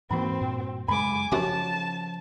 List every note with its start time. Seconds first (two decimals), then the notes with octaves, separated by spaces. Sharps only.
0.11 G#2 E3 A#3 C4 F#4 B5
0.41 G2 A#2
0.88 F#2 C#3 G#3 G#5 B5 D6
1.32 F#2 C#3 F3 C#4 F#4 A5 D6